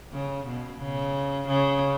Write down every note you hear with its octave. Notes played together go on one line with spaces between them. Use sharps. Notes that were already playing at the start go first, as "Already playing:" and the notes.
C#3
B2
C#3
C#3